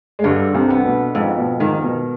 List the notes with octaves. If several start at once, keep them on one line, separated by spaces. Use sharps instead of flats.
G#3
G2 D3 G3
C2 C3
B3
B2
F2 G#2
B2
G#2 D#3
B2